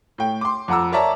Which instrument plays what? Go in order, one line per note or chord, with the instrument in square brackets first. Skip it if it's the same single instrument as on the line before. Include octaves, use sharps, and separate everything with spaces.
[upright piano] A2 G5
C6 D6
F2 F#5 A#5 E6
A#4 C#5 D5 E5 A5 A#5